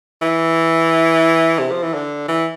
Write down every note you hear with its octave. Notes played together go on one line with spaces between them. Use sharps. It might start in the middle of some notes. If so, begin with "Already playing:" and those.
E3
C3
F3
E3
D3
E3